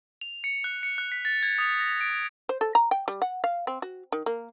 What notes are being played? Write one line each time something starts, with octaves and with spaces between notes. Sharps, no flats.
F7
C#7
F#6
C#7
F#6
B6
A6
G#6
D#6
A#6
D7
C5
A4
A#5
G5
G3
F#5
F5
C4
F#4
D#3
A#3